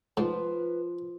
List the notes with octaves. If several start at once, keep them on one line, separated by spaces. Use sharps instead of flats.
G#2 F3 B4